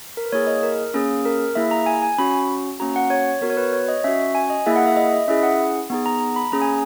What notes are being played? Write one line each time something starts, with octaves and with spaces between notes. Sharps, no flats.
A#4
B4
A#3 E4 G#4 C#5
D#5
A#4
A#3 C#4 G#4
A#4
A#3 E4 G#4 E5
A#5
G#5
G#5
C#4 F#4 B5
A#3 C#4 F#4 A#5
F#5
C#5
B3 F#4 A#4
C#5
B4
C#5
D#5
C#4 F#4 E5
G#5
D#5
A#3 E4 G#4 E5
F#5
E5
D#5
D#5
C#4 E4 G#4 E5
F#5
B3 D#4 G#4
A#5
A#5
B5
A#3 C#4 G#4 A#5
G#5